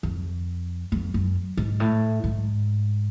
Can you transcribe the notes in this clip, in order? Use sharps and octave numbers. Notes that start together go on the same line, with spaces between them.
F2
F2
F#2
G#2
A2
G#2